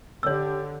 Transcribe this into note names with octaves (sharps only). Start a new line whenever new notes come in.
D3 G4 C#5 E6